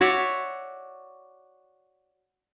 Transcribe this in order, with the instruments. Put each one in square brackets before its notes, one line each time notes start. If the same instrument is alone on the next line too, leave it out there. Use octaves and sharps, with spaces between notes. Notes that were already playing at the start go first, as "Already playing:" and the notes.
[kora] F#4 C#5 D5 E5